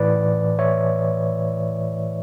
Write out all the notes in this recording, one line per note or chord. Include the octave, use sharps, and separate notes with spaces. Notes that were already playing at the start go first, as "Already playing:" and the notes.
Already playing: A2 E3 B4 D5
C#5 E5